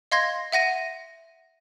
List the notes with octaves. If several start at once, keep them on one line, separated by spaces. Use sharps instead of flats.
D#5 F5 C6 G#6 A#6
E5 F#5 A#6 D#7